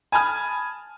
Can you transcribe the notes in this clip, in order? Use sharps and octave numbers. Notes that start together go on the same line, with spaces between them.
G#5 A5 B5 D#6 F6